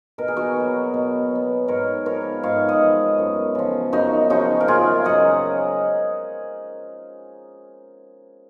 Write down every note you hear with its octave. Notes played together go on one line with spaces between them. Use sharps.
B2 A#4
G#4
F#4 A#4
F#3 B3
B2
F#3 B3
G#2 A#4 C#5
F3 B3 A#4 C#5
G#2 C#5 F5
D#5 F#5
F3 B3
F#2
C#3 F3
F#2 D#4 F#4
C#3 F3 D#4 F#4
A#4
F#2 F4 G#4
C#3 F#3 D#5 F#5